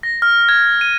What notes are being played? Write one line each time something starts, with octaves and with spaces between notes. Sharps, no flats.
A#6
F6
G#6
D#7